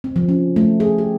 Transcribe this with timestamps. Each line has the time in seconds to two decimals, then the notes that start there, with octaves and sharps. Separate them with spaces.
0.04 C4
0.16 F3
0.29 C#4
0.56 A3
0.80 G#4
0.98 G4